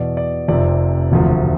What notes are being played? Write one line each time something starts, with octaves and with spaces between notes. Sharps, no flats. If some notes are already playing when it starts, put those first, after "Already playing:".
Already playing: E2 B2 D5
D5
F1 F2 C3 D5
E1 D2 C3 F3